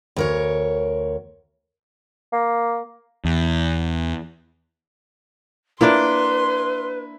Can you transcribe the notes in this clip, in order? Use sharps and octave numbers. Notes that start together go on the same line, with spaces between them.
D2 A#4 C#5
A#3
E2
A#3 D4 E4 B4 D5 C6